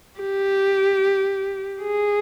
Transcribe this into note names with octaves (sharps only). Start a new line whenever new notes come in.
G4
G#4